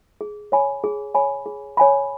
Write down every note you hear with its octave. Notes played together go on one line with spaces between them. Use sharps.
G#4
C#5 G#5 B5
G#4
C#5 G#5 B5
G#4
C#5 G#5 B5